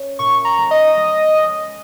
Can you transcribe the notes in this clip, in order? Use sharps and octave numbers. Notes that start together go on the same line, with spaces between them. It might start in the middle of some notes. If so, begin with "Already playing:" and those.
Already playing: C#4
A#2 C#6
A#5
G#3
D#5
G#3
G#3